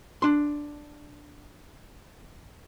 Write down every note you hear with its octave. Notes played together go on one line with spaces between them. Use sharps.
D4 C6